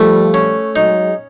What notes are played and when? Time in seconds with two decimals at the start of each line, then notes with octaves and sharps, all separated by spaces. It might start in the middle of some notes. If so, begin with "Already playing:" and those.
Already playing: F3 G3 A3
0.34 C#4
0.75 F#3 G#3 D#4